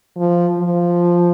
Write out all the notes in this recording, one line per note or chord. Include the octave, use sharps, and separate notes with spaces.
F3
F3